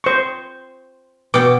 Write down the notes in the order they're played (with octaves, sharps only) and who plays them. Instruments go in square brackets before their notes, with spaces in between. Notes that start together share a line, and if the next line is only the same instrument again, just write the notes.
[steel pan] C5 C#6
[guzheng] B2 G5 [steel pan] D6